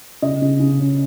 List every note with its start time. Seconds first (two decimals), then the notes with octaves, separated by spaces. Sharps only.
0.22 C#3 D#5
0.42 C#3
0.60 C#3
0.79 C#4